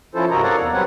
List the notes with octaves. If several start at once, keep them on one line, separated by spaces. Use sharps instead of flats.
F3 C#4 E4 F4 A4 C5
G2 C3 F#4 A#4 D#5 A#5
A4 A#4 C#5 D5 F5 F#5
E2
F#3 G3 C4 B4 C#5 F#5